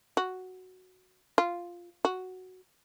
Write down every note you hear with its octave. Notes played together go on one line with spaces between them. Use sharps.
F#4
F4
F#4